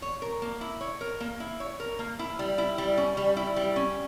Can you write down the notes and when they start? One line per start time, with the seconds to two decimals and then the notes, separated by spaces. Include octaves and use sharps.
0.02 C#5
0.22 A#4
0.42 A#3
0.61 E4
0.81 C#5
1.01 A#4
1.20 A#3
1.40 E4
1.60 C#5
1.80 A#4
1.99 A#3
2.19 E4
2.39 G3
2.58 E4
2.78 G3
2.97 C#4
3.17 G3
3.36 E4
3.56 G3
3.76 C#4